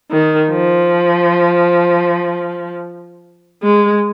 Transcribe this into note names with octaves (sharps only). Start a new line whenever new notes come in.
D#3
F3
G#3